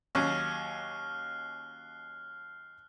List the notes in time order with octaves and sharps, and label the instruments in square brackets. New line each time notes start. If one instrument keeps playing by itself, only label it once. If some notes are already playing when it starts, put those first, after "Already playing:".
[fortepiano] D#2 F#3 C#4 [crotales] F6 F#6 C7